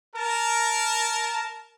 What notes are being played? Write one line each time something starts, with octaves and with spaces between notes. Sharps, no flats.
A#4 A5